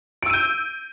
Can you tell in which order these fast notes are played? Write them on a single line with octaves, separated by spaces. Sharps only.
D7 E6 D#7 G6